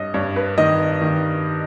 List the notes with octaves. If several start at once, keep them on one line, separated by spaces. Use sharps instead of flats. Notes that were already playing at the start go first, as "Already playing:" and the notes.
Already playing: G2 C#5 D#5
G2 C#5
B4
D#3 D#5
D#3